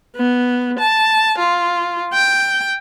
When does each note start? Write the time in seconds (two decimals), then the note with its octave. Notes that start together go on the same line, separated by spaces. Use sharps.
0.16 B3
0.79 A5
1.38 F4
2.13 G5